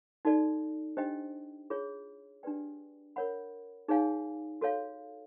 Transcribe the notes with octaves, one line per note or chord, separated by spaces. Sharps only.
D#4 F#4 A4 D5
D4 G4 C5 D#5 G5
F4 G#4 C#5
D4 G4 B4 D5 G5
A#4 C#5 F#5 B5
D#4 G#4 C#5 F5 G#5
F#4 A4 C#5 F5